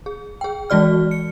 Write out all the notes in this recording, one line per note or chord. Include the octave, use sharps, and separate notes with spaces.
G#4
G#4 G5
E3 G#3 F#4 D5 F6
C#7